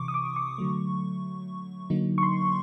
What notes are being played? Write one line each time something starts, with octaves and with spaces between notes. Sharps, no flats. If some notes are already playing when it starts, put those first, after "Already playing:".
Already playing: C3 E3 C#6 D6
D#6
D6
C#6
D3 F#3 A3
D3 F#3 A#3 D#4
C#6
C6